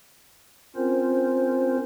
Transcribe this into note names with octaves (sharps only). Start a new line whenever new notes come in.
C4 C#4 F4 A#4 C5